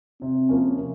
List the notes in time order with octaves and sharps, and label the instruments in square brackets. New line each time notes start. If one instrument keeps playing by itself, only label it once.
[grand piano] C3 [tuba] C4
[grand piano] F3 A#3 C#4
C3